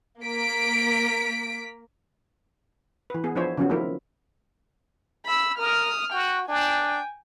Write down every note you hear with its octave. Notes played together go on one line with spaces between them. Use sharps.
A#3 B6 D7
E3 B4
B3 G#4
F3 B3 D4 E4 C5 C#5
C#3 F3 F#3 B3 C#4 F#4
D#3 F3 A3 A#3 E4 A#4
B5 E6
A#4 D#6 F6
F#4 G5
D4 G5 G#5